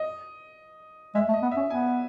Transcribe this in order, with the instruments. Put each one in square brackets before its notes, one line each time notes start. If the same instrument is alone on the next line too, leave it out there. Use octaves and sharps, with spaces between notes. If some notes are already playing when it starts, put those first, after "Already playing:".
Already playing: [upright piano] D#5
[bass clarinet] G#3 [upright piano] E5
[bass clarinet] A3
[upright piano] D#5
[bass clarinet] B3
[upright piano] E5
[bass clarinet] C#4
[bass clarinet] B3 [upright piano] G#5